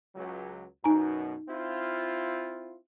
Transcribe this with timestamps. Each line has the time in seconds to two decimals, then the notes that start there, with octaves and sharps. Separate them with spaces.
0.16 C#2 F#3
0.84 F#2 B2 D#4 G#5 A#5
1.49 C4 E4 F4